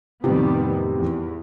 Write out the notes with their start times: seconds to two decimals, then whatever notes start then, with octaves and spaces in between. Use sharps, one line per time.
0.24 F2 A2 C3 D#3 G3 B3
0.96 E2